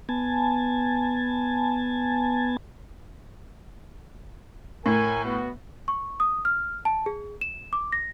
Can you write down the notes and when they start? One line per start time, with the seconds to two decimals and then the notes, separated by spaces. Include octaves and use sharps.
0.09 B3 G#5 A5
4.86 A2 A#4 G#5
5.25 B3 F#4
5.88 C#6
6.20 D#6
6.45 F6
6.85 A5
7.06 G#4
7.41 E7
7.73 D6
7.92 A#6